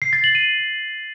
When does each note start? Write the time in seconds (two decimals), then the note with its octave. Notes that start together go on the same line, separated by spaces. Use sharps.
0.02 C7
0.13 A6
0.24 F#7
0.35 D#7